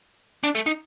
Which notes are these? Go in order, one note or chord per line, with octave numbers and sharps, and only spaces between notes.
D4
A3
D#4